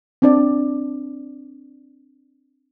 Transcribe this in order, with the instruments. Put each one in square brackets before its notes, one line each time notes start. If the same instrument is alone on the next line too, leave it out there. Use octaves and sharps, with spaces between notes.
[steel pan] C4 D4 D5